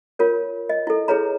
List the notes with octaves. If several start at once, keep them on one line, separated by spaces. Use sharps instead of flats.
F4 A#4 C#5
D#5
E4 A4
E4 G#4 B4 C#5 A#5